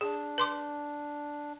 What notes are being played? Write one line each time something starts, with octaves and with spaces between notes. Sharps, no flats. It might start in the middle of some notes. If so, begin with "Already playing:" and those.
D4 G#4
B4 C6 D6